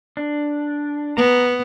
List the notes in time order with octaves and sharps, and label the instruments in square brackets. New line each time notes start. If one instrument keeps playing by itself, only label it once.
[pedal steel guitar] D4
[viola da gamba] B3 [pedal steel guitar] A#5